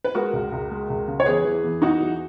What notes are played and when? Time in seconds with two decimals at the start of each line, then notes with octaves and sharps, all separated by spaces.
0.04 B4
0.15 G#3 F#4 A#4
0.33 C#2
0.52 C#2
0.71 G#3
0.90 C#2
1.08 C#3
1.20 C#5
1.26 E2 G#4 B4
1.45 E3
1.63 E2
1.82 E2 D#4 F#4
2.01 E3